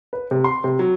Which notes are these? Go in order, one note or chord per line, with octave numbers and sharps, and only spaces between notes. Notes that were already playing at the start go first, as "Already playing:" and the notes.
B4
C3
C6
C3
F#3